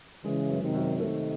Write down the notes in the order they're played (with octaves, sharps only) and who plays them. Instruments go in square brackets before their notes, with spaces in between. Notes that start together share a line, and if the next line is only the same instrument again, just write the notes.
[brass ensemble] C#3 E3 [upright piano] G#3
[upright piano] F#2
[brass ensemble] C3 D#3
[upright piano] F#2
[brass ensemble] C3 D#3 [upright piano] A3